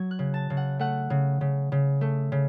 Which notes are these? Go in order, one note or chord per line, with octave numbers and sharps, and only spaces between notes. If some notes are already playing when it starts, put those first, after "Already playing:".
Already playing: F#3 G#6
F#6
C#3
A5
C#3
F#5
A3 F#5
C#3
C#3
C#3
A3
C#3